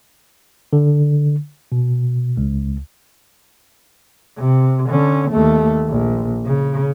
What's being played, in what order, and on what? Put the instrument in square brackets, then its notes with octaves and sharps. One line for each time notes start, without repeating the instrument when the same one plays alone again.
[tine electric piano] D3
B2
C#2
[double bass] C3
D3 C#4
D#2 A3
A#1
C#3